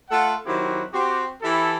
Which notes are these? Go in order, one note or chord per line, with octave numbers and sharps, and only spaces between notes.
A3 F4 A4 F#5
D#3 F#3 C4 E4 F#4 G4
C4 F#4 G4
E3 E4 G4 A4